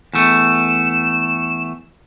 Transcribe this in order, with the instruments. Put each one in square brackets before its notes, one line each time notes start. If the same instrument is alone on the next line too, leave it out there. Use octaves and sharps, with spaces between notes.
[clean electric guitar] E2 A3 [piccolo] E7